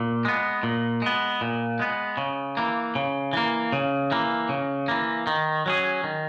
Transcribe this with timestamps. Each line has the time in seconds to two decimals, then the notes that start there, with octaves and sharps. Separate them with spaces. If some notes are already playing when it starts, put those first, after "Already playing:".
Already playing: A#2
0.25 G#3 B3
0.63 A#2
1.02 G#3 B3
1.41 A#2
1.79 G#3 B3
2.17 C#3
2.57 E3 A#3
2.95 C#3
3.33 E3 A#3
3.73 C#3
4.12 E3 A#3
4.49 C#3
4.88 E3 A#3
5.27 D#3
5.66 F#3 C#4 G#4
6.04 D#3